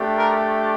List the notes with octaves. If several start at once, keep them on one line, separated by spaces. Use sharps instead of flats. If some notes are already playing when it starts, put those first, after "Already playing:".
Already playing: A3 D4 G4
A#4